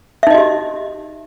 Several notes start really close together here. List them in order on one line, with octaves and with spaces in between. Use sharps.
E5 D#4 D#5 F#4 G4